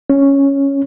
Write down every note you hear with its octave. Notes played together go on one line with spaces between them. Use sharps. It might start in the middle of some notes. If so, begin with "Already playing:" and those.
C#4